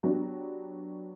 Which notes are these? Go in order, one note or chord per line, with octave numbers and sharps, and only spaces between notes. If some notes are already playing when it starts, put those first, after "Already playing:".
F#3 B3 D4 F#4 G4